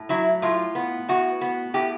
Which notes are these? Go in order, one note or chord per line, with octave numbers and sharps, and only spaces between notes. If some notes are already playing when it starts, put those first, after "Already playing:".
Already playing: A2
F#3 E4
A2 F4
B3
A2 F#4
B3
A2 G4